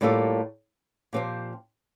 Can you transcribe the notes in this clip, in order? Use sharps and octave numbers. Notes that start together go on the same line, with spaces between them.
A2 G3 A#3 F4 A4
A#2 F3 C4 G4 C5